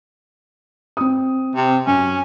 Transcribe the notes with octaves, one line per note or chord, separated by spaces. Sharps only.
C4 D#6
C3
F#2 C#4